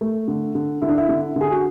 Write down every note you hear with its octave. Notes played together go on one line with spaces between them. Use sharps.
A3
D3
D3
D3 E4
D4
E4
D3
D3 G#4
F#4